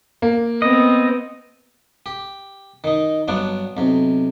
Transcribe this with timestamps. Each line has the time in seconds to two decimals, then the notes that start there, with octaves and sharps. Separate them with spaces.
0.22 A#3
0.62 B3 C4 D#5
2.06 G4
2.84 D#3 D#4
3.28 G2 F#3 B3 D4 D6
3.77 B1 C3